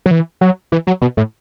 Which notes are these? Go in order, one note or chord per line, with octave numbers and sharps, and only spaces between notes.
F#3
E3
F#3
E3
F#3
B2
A2